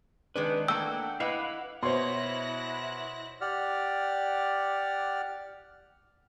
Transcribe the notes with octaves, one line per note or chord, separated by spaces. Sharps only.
D#3 G#3 D4 B4
E3 A3 A#3 F#5 G5 E6
E4 B4 D#5 F5 F#5 D6
B2 E4 C5 C#5 C6 F#6 A#6
G4 D5 F#5 F6